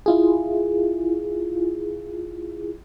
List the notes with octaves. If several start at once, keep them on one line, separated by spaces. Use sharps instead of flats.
E4 F4 G#4